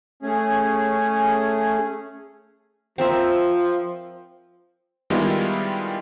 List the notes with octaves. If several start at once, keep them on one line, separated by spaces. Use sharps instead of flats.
A3 C#4 G#4
F3 C4 A#4 E5
D#3 G3 G#3 B3 E4 F4